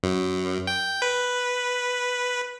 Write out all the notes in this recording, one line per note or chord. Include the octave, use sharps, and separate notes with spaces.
F#2
G5
B4